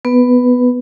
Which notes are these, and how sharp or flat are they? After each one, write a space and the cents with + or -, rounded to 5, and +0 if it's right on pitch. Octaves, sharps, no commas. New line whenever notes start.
B3 +10 B4 +0